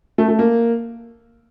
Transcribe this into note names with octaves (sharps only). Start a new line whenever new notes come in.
A3
A3
A#3